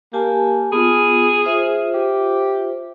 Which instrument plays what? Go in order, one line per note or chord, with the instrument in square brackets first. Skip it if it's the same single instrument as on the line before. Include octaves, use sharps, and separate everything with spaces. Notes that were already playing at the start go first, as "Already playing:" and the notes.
[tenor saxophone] A#3 [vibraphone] G4 G#5 A5
[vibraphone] B3 F4 [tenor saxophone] G#4
[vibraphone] F4 C5 E5
[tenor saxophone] G4